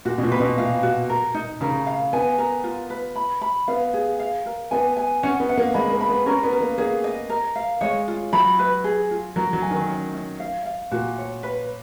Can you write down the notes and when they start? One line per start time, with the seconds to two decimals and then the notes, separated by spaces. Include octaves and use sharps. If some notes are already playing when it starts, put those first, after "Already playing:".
0.05 A#2 F#4
0.18 B2
0.23 A#2
0.32 B4
0.40 B2
0.58 A#2 F5
0.83 F#4
1.09 A#4
1.34 D#4
1.61 C#3 A#4
1.86 F5
2.13 B3 G#5
2.38 A#4
2.64 F4
2.90 B4
3.16 B5
3.42 B5
3.68 B3 F5
3.94 G#4
4.20 F5
4.46 A#4
4.71 B3 G#5
4.97 G#5
5.23 C#4 F#5
5.40 B3
5.49 F#5
5.58 A#3
5.74 G#3 B5
5.92 A#3
6.01 B5
6.09 B3
6.26 C#4 A#4
6.43 B3
6.53 A#4
6.61 A#3
6.78 A#3 G#4
7.04 D#5
7.29 A#4
7.56 F5
7.81 G#3 C#5
8.08 F4
8.33 F#3 B5
8.59 B4
8.84 G#4
9.11 F4
9.36 F#3 A#4
9.53 F#3
9.62 G#5
9.71 D#3
9.88 C#4
10.14 C#4
10.40 F5
10.65 F5
10.91 A#2 F#4
11.18 C#5
11.43 B4